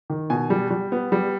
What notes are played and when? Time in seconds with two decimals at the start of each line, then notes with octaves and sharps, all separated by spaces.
0.10 D#3
0.30 B2 G#5
0.50 G3
0.70 G3
0.92 B3
1.12 G3